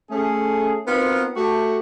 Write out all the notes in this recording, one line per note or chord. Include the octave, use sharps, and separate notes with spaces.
A3 C#4 G#4
B3 C4 D#4 F4 F#4 A#4
A3 F#4 G4